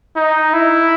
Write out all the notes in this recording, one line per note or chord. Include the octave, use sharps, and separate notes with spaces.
D#4
E4